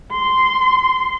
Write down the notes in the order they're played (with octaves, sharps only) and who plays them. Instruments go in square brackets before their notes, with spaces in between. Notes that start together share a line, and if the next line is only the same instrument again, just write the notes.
[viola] C6